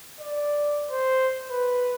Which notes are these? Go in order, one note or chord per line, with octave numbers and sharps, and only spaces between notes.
D5
C5
B4